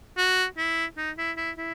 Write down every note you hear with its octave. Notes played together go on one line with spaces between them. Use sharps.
F#4
E4
D#4
E4
E4
E4